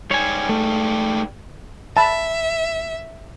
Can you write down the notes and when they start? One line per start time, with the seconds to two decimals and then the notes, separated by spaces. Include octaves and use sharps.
0.11 G#2 G3 C#5 G#5
0.49 A3
1.97 E5 A5 B5